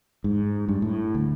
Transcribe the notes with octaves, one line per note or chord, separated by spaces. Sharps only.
G#2
G2
A2
D2